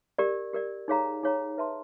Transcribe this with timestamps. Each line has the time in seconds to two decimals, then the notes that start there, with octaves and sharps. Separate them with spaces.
0.18 G4 A#4 D5
0.53 G4 A#4 D5
0.88 D#4 G#4 C#5 F5 A#5
1.23 D#4 G#4 C#5 F5 A#5
1.58 B4 E5 A5 C6